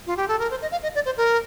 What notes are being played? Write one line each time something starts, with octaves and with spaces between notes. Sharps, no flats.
F4
G4
A4
A#4
C5
D#5
F5
D#5
D5
C5
A#4